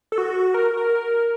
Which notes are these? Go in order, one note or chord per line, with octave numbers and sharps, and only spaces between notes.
A4
F#4
A#4
A#4